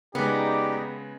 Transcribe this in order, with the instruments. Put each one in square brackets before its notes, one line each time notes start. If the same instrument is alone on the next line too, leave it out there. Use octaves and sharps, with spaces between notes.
[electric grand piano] C#3 G#3 [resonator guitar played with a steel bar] B3 [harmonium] D#4 D5 D#5 [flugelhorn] G4